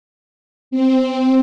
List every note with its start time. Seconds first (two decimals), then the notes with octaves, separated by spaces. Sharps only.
0.71 C4